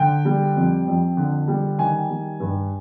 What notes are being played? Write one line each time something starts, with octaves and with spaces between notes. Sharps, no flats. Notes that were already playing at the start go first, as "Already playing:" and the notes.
Already playing: D3 G5
G3
F2
F2
D3
G3
D#3 G#5
G3
G2